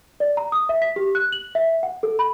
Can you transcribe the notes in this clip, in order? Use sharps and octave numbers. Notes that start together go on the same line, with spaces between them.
D5
A#5
D#6
E5
B6
G4
F#6
F#7
E5
F#5
A4
B5